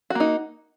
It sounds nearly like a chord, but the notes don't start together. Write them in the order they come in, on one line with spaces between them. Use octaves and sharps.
F#4 A#3 D#4